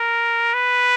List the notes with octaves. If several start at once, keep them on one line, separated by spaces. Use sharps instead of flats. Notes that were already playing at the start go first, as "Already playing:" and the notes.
Already playing: A#4
B4